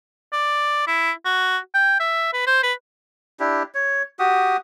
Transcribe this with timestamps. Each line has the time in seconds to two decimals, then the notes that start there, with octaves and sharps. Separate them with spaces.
0.32 D5
0.87 E4
1.25 F#4
1.74 G5
1.99 E5
2.33 B4
2.47 C5
2.63 B4
3.40 D4 E4 G4
3.75 C#5
4.19 F#4 G4 D#6